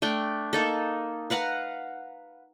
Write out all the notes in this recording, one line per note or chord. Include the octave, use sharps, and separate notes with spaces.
A3 D4 G5
A#3 D#4 A4
B4 F5 F#5 A#5